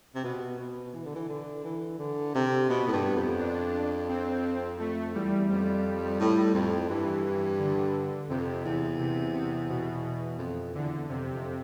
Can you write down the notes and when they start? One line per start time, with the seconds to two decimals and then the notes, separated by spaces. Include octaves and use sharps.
0.15 C3
0.24 B2
0.59 B2
0.94 E3
1.05 D3
1.15 E3
1.29 D3
1.64 E3
1.99 D3
2.35 C3
2.69 B2 B3
2.88 A2
2.93 G2
3.16 F2
3.39 D4
4.09 C4
4.79 F2 A3
5.14 E2 G3
5.49 F2 G3
6.20 A2
6.54 F2
6.90 G2 E3
7.59 D3
8.29 F2 C3
8.65 E2
8.99 C3
9.34 C3
9.69 B2
10.39 F2
10.74 E2 D3
11.09 F2 C3
11.33 F2